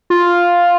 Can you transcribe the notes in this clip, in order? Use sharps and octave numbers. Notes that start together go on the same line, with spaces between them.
F4